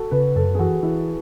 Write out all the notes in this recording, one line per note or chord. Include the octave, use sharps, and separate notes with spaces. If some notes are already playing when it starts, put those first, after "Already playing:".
Already playing: F#4 A4
C#3 B4
F#2 A4
G#4
E3 F#4
E3 E4